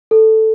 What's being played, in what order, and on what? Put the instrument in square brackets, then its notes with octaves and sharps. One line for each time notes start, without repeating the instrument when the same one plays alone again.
[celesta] A4